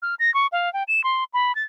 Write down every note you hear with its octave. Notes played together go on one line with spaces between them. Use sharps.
F6
A#6
C#6
F5
G5
E7
C6
B5
A6